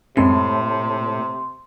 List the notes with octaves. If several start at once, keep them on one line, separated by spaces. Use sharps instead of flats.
F#2 A2 C3 G#3 C4 C6